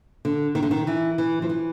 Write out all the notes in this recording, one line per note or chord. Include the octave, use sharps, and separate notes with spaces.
D3
D#3
D3
D#3
E3
E3
F3
E3